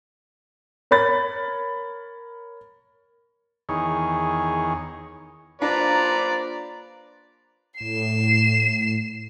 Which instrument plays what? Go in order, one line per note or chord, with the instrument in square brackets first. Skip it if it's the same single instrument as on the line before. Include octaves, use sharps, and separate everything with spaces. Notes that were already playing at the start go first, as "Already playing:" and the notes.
[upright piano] A#4 C#5 B5 A6
[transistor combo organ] E2 D#3 G#4 C#5
[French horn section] A#3 F4 C5 [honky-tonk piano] D4 [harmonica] B4 D5 [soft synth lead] A#5
[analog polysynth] A2 [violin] C7 E7